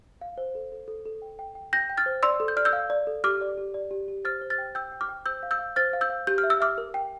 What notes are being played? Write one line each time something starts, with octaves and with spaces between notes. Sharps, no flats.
F5
C5
A4
A4
A4
A4
G5
G5
G5
G5 G6 A#6
G5
F6 A6
C5
D5 C6 E6
A4
G6
D5 F6
E6 G6
F5
D5
A4
G4 D6 F6
D5
G4
D5
G4
G4
C5 F6 A6
C5
F6 A6
G5
G5 E6 G6
G5
D6 F6
G5
C5 E6 G6
F5
E6 G6
F5
C5 F6 A6
F5
E6 G6
F5
G4 G6
F6
E5
E6
E5 D6 F6
A#4
G5